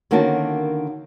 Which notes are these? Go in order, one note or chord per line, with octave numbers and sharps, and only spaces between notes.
D3 D#3 A#3 C#4 F#4 A5